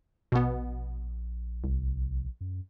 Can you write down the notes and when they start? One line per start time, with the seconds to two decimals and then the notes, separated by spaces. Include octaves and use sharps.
0.32 A#1 B2 B3
1.64 C2
2.41 F#2